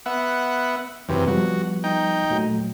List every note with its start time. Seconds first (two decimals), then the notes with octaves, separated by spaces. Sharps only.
0.06 B3 E5 F#5
1.09 F#2 C3 E3 B4
1.27 F3 G3 B3 F#4
1.84 D#4 G5
2.30 A#2 F#3 A3